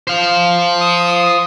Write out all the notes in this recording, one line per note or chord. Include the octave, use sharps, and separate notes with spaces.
C5 F5
D#6